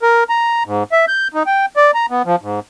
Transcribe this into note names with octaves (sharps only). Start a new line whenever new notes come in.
A#4
A#5
G#2
E5
G6
D#4
G5
D5
A#5
B3
F3
G#2